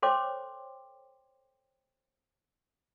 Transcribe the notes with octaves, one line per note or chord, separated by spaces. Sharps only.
A4 C5 C#5 G5 C6 D6